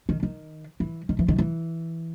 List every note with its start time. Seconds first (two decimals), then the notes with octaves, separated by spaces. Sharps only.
0.09 D#3
0.23 D#3
0.80 E3
1.09 D#3
1.19 E3
1.28 D#3
1.38 E3